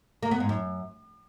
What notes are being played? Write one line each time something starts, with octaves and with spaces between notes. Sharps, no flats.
A#3
B3
G#2
F#2